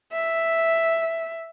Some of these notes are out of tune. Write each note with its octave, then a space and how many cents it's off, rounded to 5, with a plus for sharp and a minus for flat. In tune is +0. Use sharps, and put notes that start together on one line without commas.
E5 +0